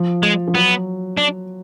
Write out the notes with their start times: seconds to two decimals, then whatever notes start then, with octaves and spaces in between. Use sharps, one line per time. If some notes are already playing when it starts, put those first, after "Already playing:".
Already playing: F3
0.23 G#3
0.48 F3
0.55 F#3 B3
1.17 D4